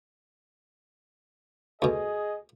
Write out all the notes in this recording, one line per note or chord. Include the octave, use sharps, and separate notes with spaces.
D2 B2 G#4 D#5